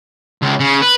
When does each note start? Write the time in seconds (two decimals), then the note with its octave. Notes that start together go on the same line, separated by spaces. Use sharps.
0.42 C#2
0.59 C#3
0.82 B4